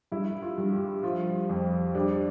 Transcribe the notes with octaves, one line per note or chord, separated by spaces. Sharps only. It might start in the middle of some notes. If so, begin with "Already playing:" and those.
G2 E4
F4
G2
G4
F3 F4
F2
G3 D4